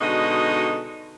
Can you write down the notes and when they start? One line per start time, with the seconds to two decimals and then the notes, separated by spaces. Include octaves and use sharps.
0.01 B2 D3 G#3 D#4 F#4 D#5